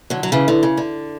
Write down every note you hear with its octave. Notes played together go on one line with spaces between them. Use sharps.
D3 F#3
F#3
C#3 E3
D3
C#3
D3